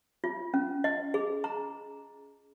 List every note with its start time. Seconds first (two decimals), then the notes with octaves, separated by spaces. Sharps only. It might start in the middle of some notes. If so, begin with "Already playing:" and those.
0.24 F4
0.54 C#4
0.84 D#5
1.14 G#4
1.44 A#5